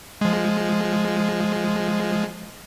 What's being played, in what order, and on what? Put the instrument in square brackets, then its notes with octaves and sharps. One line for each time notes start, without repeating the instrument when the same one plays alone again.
[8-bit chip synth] F3 G#3